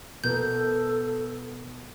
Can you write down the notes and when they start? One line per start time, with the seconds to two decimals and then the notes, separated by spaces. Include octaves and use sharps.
0.24 B2 B3 A4 A#4 G6